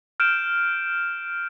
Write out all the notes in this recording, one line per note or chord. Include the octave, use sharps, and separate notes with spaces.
F6 G6 D7 E7